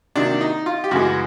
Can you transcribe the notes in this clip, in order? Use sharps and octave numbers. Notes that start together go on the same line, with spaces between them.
C3 D#3 F#3 A#3 D4
D#4
F4
G4
F#2 C#3 E3 G#3 F#4